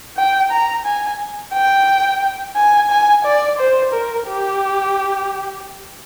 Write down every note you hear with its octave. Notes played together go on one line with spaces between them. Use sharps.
G5
A#5
G#5
G5
G#5
G#5
D5
C5
A#4
G4